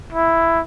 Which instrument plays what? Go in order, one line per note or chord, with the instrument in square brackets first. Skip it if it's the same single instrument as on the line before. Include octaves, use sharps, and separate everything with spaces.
[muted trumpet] E4